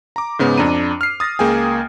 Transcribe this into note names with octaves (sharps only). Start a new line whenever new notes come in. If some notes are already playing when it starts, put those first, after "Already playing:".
A#5 D6
G#2 C#3 B3
F2 D4 A#5 D#7
F6 C7
D#6 A6 A#6
C#2 A#3 G#4 G5 G#5